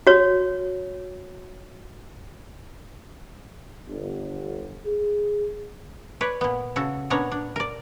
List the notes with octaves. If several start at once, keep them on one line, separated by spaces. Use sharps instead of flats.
F#4 C#5
G1
G#4
B4 C#5 D5
A#2 B3
C#3 F#4 A4
A#2 B3 C#4 D4 C#5 A#5
D4
A#4 D5